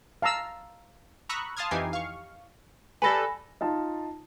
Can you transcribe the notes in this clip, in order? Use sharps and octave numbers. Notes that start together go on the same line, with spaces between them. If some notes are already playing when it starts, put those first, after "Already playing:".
F5 A5 A#5 E6
A#5 B5 C#6 D#6 E6 F#6
F5 A5 C6 D#6 F6 G#6
F2 E3 D#4 G4 G#5 C7
F5 C#6
G3 A4 B4 G#5 B5 A#6
D#4 F4 A5